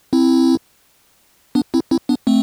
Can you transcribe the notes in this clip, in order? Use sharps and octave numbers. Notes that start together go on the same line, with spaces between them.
C4 E4
B3 D4
C4 E4
C4 E4
B3 D4
A3 C4